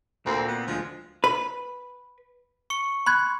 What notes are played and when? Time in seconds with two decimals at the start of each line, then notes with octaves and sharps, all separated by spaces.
0.26 D2 A#2 A#3 C4
0.48 B3
0.67 D2 F3 G#3
1.24 B4
2.70 C#6 C#7
3.06 B5 C6 F#6 G#6